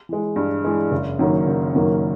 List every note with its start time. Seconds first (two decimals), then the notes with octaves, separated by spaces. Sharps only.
0.09 E3 G#3
0.36 G2
0.64 E3 G#3
0.91 F#1
1.19 F#2 D#3 F#3 A#3
1.47 F#1
1.75 F#2 D#3 F#3 A#3